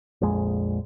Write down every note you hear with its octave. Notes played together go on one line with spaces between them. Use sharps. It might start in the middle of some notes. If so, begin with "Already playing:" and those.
A#1 F2 G#3